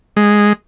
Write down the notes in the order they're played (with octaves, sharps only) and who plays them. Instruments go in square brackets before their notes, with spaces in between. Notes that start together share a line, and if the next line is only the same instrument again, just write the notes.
[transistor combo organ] G#3